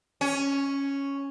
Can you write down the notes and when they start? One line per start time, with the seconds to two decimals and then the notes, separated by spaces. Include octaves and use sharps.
0.21 C#4